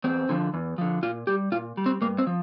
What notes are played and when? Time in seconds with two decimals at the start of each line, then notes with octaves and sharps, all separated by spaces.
0.04 E2 C4
0.29 D3 F3
0.54 E2
0.78 D3 F3
1.03 A#2 F4
1.27 G3 G4
1.52 A#2 F4
1.77 G3
1.86 C4
2.01 G2 A#3
2.18 C4
2.27 F3